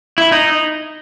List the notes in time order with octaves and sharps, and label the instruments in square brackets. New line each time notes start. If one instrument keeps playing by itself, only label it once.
[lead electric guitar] E4
D#4